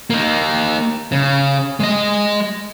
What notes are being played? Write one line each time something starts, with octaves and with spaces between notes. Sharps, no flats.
A#3 D#4
C#3
G#3 D#5